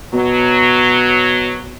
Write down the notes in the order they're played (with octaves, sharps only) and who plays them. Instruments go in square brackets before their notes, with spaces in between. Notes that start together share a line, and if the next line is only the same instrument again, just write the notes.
[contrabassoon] B2 [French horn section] F#3